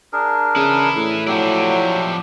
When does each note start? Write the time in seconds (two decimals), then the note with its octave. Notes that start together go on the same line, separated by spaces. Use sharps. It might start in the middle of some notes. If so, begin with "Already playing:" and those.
0.13 D4 G#4 A#4
0.56 C#3 E4 B4
0.96 A2
1.27 F3 F#3 D4 E4 G4